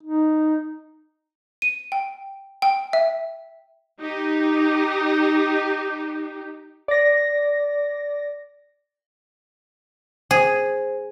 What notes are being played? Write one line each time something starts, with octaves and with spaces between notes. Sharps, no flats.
D#4
D#7
G5
G5
E5
D#4 G4
D5 A#6
G#4 C5